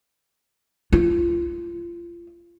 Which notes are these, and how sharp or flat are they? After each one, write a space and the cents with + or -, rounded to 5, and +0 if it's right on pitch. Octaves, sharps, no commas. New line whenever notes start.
F4 -30